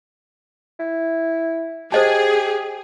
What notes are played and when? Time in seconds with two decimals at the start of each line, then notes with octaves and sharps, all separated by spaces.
0.80 E4
1.92 G4 G#4 C5 D#5 A5